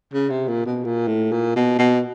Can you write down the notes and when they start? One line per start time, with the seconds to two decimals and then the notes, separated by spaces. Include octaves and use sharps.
0.13 C#3
0.30 C3
0.48 A#2
0.66 B2
0.84 A#2
1.08 A2
1.32 A#2
1.56 B2
1.79 B2